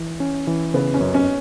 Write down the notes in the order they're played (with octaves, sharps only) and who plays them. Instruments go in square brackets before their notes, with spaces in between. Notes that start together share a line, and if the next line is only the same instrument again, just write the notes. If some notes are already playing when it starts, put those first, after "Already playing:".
Already playing: [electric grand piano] E3
C#4
E3
[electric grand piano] C#3 [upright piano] B3
[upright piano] C#4
[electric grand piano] F#2
[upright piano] C#4